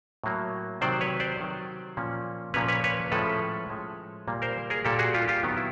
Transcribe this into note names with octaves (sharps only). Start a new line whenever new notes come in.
A2 F#3 A#3
C3 D#3 F#3 C5 D5
B4 C#5
C5 D5
C3 D#3 F#3
A#2 F3 A#3 C#4
A#2 F3 A#3 C#4 B4 C#5
B4 C#5
B4 C#5
A2 F3 G#3 C#4 A4 B4
A2 F3 G#3 C#4
A#2 G3 A#3
A#4 C5
G#4 A#4
A#2 G3 A#3 G4 A4
F#4 G#4
F4 G4
F4 G4
D#3 F#3 B3
E4